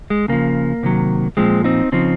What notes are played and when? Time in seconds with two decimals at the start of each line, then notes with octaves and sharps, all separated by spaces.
0.10 G#3
0.28 C#3 F3 A#3
0.83 C3 D#3 F#3
1.37 A#2 F3 G#3 C4
1.64 C4 D#4
1.92 C#3 F3 C4 D#4